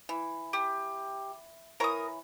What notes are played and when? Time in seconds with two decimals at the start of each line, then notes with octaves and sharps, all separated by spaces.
0.09 E3
0.53 G4
1.80 E3 A#4 C#5 A#5 D#6